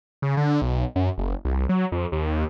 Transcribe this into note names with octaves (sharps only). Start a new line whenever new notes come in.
C#3
D3
B1
F#2
F#1
C2
F#3
F2
D#2